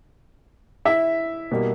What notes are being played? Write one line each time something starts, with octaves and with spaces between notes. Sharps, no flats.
E4 E5
B2 G3 A#3